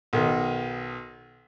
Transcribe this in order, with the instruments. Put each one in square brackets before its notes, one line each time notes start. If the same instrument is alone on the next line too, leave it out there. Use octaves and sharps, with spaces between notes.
[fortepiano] B1 D#3